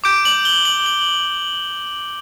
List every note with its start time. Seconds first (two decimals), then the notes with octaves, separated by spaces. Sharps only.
0.04 D6 G6 D7
0.25 F#7
0.45 G7
0.65 F#7
0.86 F#7